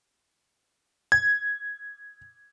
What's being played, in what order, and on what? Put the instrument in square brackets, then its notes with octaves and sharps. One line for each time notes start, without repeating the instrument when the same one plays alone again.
[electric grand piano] G#6